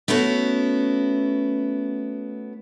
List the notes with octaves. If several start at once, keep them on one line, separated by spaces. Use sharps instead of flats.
A3 B3 C#4 E4 F#4